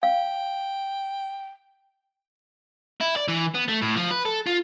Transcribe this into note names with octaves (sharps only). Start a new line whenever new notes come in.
F5 G5
E4
D5
E3
B3
A3
A2
F3
B4
A4
F4